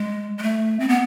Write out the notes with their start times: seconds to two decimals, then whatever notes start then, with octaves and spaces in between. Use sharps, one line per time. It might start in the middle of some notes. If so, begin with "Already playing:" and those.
Already playing: G#3
0.38 G#3
0.43 A3
0.80 C4
0.89 B3